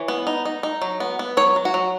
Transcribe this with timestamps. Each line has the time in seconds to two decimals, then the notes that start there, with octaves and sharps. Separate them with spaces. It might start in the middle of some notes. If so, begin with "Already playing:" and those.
Already playing: E3 C#5
0.08 B3
0.27 D#4
0.45 D#4
0.63 D#4
0.82 F#3
1.00 B3
1.19 B3
1.37 F#3 C#5
1.56 F#3
1.65 F#4
1.74 F#3